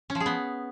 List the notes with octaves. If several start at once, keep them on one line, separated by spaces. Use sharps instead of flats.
C#4
F3
G#4
B3